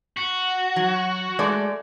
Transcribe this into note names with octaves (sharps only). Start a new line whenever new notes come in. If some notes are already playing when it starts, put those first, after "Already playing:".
F#4
F#3
G#3 A3 D5